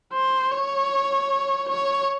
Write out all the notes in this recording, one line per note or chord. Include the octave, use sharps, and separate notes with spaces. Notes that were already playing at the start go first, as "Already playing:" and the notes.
C5
C#5
C#5